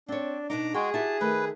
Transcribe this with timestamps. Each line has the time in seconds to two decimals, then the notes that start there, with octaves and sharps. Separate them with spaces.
0.08 C4 D4 C#5
0.50 B2 D4 D#4 A#5 D6
0.74 G#3 F#4 G#4 G5
0.94 E4 F#4 G4 A5
1.21 D#3 A3 B4